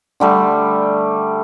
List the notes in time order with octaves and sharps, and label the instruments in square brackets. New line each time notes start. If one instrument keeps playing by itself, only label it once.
[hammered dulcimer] D3 G3 A3